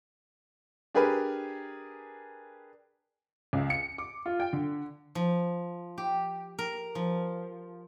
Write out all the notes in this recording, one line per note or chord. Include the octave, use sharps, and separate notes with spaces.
D4 G4 G#4 A#4 B4
C#2
C#7
D6
F4
G5
D3
F3
G4
A#4
F3